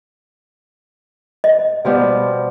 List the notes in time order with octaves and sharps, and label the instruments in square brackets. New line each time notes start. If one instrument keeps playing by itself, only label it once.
[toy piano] D#5
[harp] B2 F3 G3